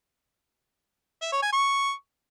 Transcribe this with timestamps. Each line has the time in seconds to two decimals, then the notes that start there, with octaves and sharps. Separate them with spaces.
1.22 E5
1.32 C#5
1.42 G#5
1.53 C#6